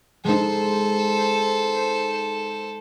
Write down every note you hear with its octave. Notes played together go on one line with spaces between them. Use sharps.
G#3 D#4 A4 C5